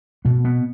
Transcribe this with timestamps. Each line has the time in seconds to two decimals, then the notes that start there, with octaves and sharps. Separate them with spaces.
0.25 B2 B3
0.45 B3